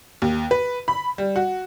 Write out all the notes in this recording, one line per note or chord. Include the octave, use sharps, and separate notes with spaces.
D#2
B4
B5
G3
F#4